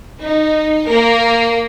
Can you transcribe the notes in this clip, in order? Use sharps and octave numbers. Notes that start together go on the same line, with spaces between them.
D#4
A#3 A#4